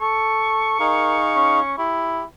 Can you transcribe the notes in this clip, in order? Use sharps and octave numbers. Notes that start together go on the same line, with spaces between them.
A4 C#6
D#4 G#4 A#4 F5
C#4
E4 G4